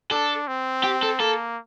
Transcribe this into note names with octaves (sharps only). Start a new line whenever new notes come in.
D4 A4
C4
G4
A4
A#3 A4